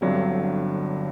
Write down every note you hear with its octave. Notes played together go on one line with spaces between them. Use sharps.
G1 G2 D3 F#3 C4